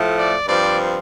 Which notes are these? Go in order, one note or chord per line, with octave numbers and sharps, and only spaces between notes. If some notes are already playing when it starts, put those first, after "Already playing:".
Already playing: A2 F3 A3
D5
G2 F3 C4 D5